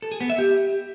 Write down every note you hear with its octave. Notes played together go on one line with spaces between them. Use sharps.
A4
G#4
B3
E5
G4